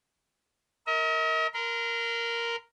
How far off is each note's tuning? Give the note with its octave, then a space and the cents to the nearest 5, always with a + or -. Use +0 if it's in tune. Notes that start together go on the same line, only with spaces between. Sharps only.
A#4 -10 D#5 +45
A#4 +0 C6 -40